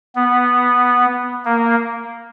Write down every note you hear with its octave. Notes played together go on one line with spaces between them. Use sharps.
B3
A#3